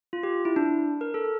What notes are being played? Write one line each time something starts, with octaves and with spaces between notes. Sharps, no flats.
F4
G4
E4
D4
A#4
A4